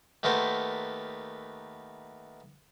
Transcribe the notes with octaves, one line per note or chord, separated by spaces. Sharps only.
D#2 A3 B3 A#4 C5 A5